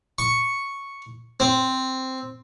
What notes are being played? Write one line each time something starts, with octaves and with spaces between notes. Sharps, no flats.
C#6
C4